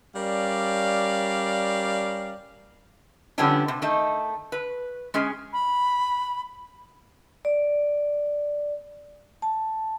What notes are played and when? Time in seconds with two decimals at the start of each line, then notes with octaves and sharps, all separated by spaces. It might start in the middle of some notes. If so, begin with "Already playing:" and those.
0.16 G3 C#4 A#4 D5 F5
3.38 D3 F3 G3 B3 C#4 D4
3.68 C3
3.82 D#3 A3 D#4 A5
4.52 B4
5.14 G#3 C#4 G#4
5.52 B5
7.45 D5
9.42 A5